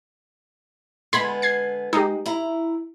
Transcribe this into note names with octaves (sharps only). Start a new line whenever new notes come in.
D3 G#3 B3 B5 C6 G#6
G#6 C7
G#3 D#4 G4
E4 A#5